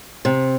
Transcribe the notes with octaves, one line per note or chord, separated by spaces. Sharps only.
C3